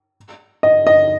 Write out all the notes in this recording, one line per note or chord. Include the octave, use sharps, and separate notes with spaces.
D#5
D#5